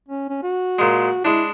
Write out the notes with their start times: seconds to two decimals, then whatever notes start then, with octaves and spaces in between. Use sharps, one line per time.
0.08 C#4
0.29 C#4
0.43 F#4
0.79 A#2 G#3
1.25 G#3 D4 E4